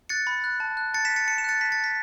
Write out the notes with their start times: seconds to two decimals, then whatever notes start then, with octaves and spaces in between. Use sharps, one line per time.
0.09 F#6 A6 C#7
0.27 B5
0.44 F#6
0.60 A5
0.77 F#6
0.94 A5 A6 C#7
1.05 B6 E7
1.11 F#6
1.16 A6 C#7
1.27 A5 C#7
1.38 E7
1.44 F#6 A6 C#7
1.61 A5 B6
1.72 A6 C#7
1.78 F#6
1.84 B6